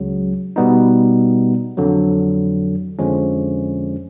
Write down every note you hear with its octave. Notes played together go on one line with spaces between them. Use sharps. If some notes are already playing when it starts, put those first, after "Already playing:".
Already playing: C#2 C#3 F#3
B2 G3 B3 D#4
F2 D3 F#3
F2 D3 F3 G#3 C#4